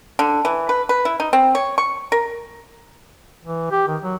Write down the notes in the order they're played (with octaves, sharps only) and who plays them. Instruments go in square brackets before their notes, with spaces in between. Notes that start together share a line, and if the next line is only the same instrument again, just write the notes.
[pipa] D3
E3
B4
B4
E4
D#4
C4
C#5
C#6
A#4
[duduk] E3
G4
D#3
F#3